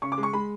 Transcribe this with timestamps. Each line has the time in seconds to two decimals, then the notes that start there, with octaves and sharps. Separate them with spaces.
0.02 C#3 C#6
0.12 D6
0.18 G#3
0.23 C#6
0.33 G#3 B5